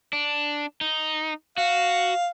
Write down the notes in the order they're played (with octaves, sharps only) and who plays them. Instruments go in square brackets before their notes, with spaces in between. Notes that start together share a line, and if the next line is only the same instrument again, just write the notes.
[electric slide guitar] D4
D#4
[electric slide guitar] F#4 [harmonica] F5